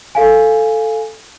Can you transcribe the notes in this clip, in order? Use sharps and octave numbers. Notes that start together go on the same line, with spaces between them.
A4 F5 G#5